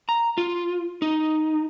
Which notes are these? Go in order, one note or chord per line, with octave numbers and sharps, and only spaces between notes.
A#5
F4
D#4